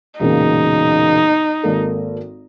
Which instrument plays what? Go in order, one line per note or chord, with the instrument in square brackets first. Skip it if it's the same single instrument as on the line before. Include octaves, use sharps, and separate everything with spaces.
[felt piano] E1 A#2 C#3 [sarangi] D#4
[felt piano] G#1 A#3 A4